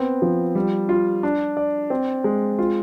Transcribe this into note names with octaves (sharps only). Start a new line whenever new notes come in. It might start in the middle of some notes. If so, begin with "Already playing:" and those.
Already playing: B3 C4
F3
G3
F4
D4
D5
C4
G#3
F4